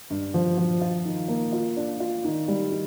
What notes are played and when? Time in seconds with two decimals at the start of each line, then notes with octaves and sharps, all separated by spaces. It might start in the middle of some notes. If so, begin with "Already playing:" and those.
0.10 G2
0.34 F3
0.58 F3
0.82 F4
1.05 D#3
1.28 A#3
1.53 F4
1.77 D4
2.00 F4
2.24 D#3
2.48 G3
2.72 D#3